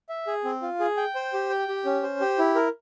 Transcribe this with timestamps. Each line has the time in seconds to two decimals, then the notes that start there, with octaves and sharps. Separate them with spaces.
0.09 E5
0.27 G#4
0.44 C4
0.62 F4
0.80 G#4
0.97 G5
1.15 C5
1.33 G4
1.50 G5
1.68 G4
1.85 C#4
2.03 C5
2.21 G4
2.39 E4
2.55 A#4